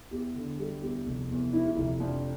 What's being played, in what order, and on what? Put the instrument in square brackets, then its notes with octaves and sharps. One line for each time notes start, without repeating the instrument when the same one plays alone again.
[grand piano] E2 G4
D3
G3 A4
E2 G4
F1
E2
E3 E4
F4
F1 E4
F2 D4